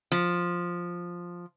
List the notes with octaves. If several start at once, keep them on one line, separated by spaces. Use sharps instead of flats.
F3